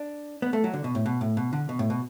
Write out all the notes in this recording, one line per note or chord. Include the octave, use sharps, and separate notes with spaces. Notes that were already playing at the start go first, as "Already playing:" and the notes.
Already playing: D4
B3
A3
F#3
D3
B2
A2
B2
A2
B2
D3
B2
A2
B2